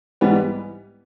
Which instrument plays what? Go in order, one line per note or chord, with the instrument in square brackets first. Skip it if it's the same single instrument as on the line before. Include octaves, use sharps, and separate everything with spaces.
[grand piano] G#2 E3 G3 B3